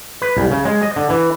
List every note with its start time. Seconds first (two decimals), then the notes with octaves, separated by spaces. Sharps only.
0.22 B4
0.37 C2
0.51 C#3
0.65 G#3
0.83 D#5
0.96 D3
1.10 E3